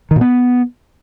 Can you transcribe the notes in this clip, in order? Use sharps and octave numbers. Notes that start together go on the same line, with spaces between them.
D#3
A#2
B3